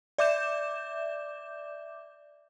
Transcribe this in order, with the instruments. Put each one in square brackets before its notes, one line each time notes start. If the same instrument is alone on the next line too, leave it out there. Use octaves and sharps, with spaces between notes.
[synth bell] D5 E5 D6 G6 E7